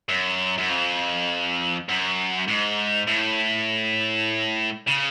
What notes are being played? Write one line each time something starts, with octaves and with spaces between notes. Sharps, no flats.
F#2
F#2
F2
F#2
G#2
A2
C#3